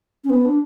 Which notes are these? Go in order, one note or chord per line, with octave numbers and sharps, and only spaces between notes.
C#4
B3
D4